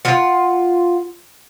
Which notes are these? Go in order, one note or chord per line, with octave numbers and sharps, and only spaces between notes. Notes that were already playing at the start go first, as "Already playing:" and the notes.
F4 F#5